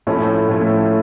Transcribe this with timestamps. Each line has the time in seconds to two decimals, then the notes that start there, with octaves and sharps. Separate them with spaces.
0.07 A2 F3 A3 C#4 E4
0.49 A2 F3 A3 C#4 E4